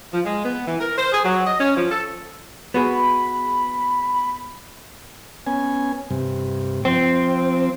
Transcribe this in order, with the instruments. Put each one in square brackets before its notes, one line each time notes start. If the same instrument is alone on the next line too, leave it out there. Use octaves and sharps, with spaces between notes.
[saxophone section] F3
G#3
B3
E3
A#4
C5
G#4
F#3
D#5
C#4
F3
A4
[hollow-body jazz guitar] B3 F#4 G#4 [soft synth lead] B5
[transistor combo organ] B3 C#4 G#5
G2 C3
[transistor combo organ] F3 [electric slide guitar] C4